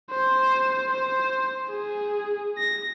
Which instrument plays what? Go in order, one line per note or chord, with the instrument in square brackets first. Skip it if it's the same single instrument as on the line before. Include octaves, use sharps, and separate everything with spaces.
[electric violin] C5
C5
G#4
A#6